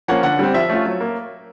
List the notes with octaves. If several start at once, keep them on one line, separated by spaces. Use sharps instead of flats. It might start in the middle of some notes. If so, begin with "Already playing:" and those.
F3 A#3 C#4 F#5
D3 F#5
G3 C4
F3 E5
A3 C#4 F4
F#3
A#3